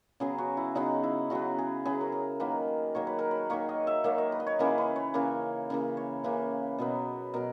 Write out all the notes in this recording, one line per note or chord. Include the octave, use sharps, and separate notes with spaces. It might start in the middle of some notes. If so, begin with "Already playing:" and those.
C#3 F#3 B3 G#4
F#4
E4
C#3 F#3 B3 D#4
E4
C#3 F#3 B3 F#4
G#4
C#3 F#3 B3 G#4
A#4
G#4
D#3 F#3 A#3 B4
D#3 F#3 A#3 C#5
B4
A#4
B4
D#3 F#3 A#3 C#5
D#5
E5
D#3 F#3 A#3 E5
D#5
B4
D#5
C#5
C#3 E3 A#3 B4
B4
C#5
C#3 E3 A#3
C#3 E3 A#3
C#5
C#3 E3 A#3 B4
B2 F#3 B3
B2 F#3 A#4